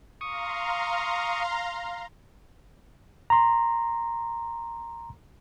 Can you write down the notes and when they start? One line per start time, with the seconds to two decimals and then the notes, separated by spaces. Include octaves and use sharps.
0.21 F5 A#5 C6 C#6 D#6
3.30 A#5 C6